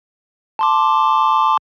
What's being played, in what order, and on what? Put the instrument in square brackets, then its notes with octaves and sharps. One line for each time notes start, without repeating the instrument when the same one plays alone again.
[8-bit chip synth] A5 C6 D6